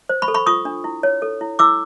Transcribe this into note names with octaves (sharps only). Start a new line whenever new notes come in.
C5
B5 C#6
A4
B5 C#6
F4 C#6 D#6
D4
E4
C#5
A4
E4
E4 D6 E6